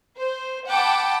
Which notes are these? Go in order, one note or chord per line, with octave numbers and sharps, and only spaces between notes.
C5
F#5 G5 A5 B5 D6